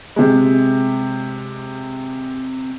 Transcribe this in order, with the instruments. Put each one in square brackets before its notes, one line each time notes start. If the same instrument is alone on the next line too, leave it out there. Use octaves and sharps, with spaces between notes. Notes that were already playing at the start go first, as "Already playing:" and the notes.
[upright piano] C3 G#3